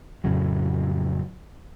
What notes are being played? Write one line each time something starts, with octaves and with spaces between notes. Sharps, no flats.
F2 A2 C#3 F#3